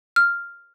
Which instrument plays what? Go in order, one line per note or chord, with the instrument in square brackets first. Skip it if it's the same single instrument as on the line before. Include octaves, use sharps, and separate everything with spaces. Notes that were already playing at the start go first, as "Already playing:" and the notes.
[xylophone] F6